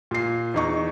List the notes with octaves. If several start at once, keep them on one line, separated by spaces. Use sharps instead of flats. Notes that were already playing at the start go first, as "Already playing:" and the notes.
A#2 C7
E2 D#4 C#6